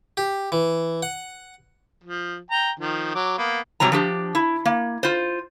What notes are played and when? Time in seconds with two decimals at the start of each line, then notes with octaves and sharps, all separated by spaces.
0.17 G4
0.52 E3
1.03 F#5
2.04 F3
2.51 G5 A#5
2.79 D#3 F3
3.15 F#3 D6
3.38 A#3 B3
3.80 G#2 C3 F#3 G3 A#5
3.92 F3 D4 G4
4.35 E4
4.65 A#3
5.03 F4 C5